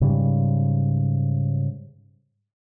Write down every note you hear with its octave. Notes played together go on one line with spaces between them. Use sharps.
G#2 C#3 G3